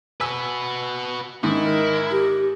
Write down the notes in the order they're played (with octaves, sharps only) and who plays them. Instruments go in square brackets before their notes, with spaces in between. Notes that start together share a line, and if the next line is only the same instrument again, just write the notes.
[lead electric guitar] F#4 B4 [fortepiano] G#5 B5 E6
[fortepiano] G#2 [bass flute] D#3 [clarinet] C#4 [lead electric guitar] E4
[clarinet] A#4
[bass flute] G4